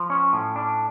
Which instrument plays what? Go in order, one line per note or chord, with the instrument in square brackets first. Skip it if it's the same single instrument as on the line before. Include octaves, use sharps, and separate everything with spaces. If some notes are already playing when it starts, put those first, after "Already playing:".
Already playing: [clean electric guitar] F3
C#4
A2
D4